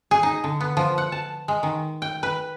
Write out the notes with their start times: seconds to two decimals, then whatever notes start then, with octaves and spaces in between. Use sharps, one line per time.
0.11 G#4
0.23 D#4
0.44 D3
0.61 B3
0.77 F3
0.98 F#5
1.12 A5
1.48 G#3
1.63 D#3
2.02 G5
2.23 B4